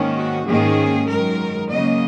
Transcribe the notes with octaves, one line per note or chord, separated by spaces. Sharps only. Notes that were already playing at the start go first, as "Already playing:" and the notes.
Already playing: G#2 D#3 A#3 C#4
F#4
G#2 D#3 A#3 C#4 G#4
F#2 D#3 G#3 A#4
C#3 F#3 A#3 D#5